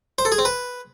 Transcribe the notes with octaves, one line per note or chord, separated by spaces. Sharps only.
C5
A4
G#4
C4
B4